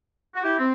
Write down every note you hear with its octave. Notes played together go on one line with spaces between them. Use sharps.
F#4
E4 G4
C4